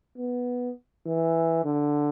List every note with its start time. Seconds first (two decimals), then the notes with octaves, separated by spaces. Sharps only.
0.18 B3
1.07 E3
1.65 D3